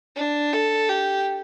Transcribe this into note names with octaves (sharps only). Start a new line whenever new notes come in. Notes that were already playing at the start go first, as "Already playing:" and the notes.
D4
A4
G4